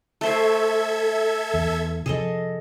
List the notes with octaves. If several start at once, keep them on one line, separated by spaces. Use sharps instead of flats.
A3 A4 C5 E5 G#6
E2
C3 F3 G#4 A4 D#5